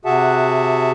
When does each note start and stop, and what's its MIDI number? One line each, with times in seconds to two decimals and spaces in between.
0.05 0.92 48
0.05 0.92 66
0.05 0.92 68
0.05 0.92 76
0.05 0.92 78
0.05 0.92 81